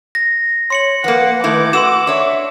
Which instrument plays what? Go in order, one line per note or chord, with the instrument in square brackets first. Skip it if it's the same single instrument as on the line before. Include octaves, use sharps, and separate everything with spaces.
[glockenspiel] A#6
[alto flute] C#5 [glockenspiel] C6 C#7 F#7
[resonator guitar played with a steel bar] F3 A#3 [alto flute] B4 [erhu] F#5
[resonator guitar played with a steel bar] D#3 A3 E4 [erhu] D6
[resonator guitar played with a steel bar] F#4 [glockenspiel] C6 E6 E7
[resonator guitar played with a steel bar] D4 C#5 [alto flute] E5